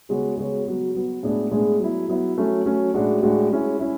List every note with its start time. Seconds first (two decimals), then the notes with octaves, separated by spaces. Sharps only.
0.09 C#3 G#3 B3 F#4 C#5
0.37 C#3 G#3 B3 F#4 C#5
0.66 F#3 B3 F#4
0.95 F#3 B3 F#4
1.23 A2 G#3 B3 D4 G#4
1.51 A2 G#3 B3 D4 G#4
1.80 F#3 B3 E4
2.09 F#3 B3 E4
2.37 F#3 A3 C#4
2.66 F#3 A3 C#4
2.94 A2 G#3 D4 F#4
3.23 A2 G#3 D4 F#4
3.51 G#3 C#4 E4
3.80 C#4 E4